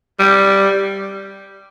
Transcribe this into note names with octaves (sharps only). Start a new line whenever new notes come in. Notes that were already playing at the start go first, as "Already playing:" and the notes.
G3